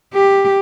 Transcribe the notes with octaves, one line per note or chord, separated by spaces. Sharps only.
G4